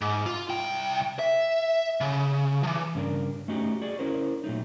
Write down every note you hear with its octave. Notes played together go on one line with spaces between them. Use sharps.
G#2
F4
C2 G5
E5
C#3
E3 F3
G2 C#3 D4 F#4 A#4
A3 C#4 D#4 F#4 G4
F#4 G#4 D5
C#4 E4 A#4 C5
A#2 F#3 A3 D#4